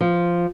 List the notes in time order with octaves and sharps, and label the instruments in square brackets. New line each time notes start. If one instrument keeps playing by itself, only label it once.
[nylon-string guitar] F3